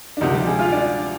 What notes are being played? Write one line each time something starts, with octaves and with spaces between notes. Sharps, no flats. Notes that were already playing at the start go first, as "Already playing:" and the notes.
D4
D2 C3 D#3 F3 D#4
G3 G4
G#3 G#4
F4 F5
D4 D5